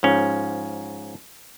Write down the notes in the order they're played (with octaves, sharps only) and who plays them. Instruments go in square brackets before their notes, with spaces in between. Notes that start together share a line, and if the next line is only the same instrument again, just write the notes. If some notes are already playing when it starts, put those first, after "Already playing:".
[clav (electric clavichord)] G#2 F3 C#4